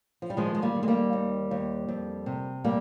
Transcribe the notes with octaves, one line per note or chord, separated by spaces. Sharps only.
F3
G3
D#3 F3 G#3
G#3
G3 A#3
D#3
G#3
G3 A#3
D#2
D#2
F2
C3
G3 A#3